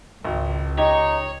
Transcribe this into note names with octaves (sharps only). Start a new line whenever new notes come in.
G#1 C#2
D#4 G4 C#5 D#5